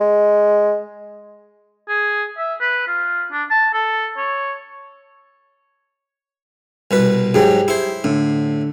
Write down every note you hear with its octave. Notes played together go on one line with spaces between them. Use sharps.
G#3
G#4
E5
B4
F4
D4
A5
A4
C#5
C2 B2 B4
G#2 F#3 G4 G#4
E4 C5
A2 D3